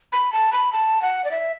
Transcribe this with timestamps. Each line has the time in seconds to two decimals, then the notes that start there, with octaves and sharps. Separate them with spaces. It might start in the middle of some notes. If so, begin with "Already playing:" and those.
0.12 B5
0.33 A5
0.52 B5
0.73 A5
1.02 F#5
1.24 D5
1.31 E5